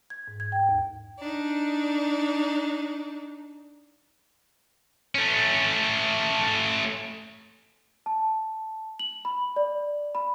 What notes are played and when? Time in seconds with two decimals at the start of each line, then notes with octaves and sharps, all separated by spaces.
0.10 G#6
0.28 G#2
0.40 G#6
0.52 G5
0.69 D#2
1.19 D4 D#4
5.15 A3 C#4
8.06 A5
8.99 F#7
9.25 B5
9.56 D5
10.15 B5